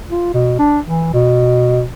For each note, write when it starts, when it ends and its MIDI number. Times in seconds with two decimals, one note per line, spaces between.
0.10 0.33 65
0.34 0.57 47
0.59 0.79 62
0.85 1.09 52
1.13 1.85 47